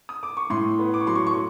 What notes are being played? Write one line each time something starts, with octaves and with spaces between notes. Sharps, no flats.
D#6
D6
C#6
A2 C6
B3
D6
C#6
F#3 C6
C#6
C#6